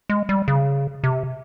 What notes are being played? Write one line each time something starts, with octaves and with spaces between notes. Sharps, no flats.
G#3
G3
C#3
C3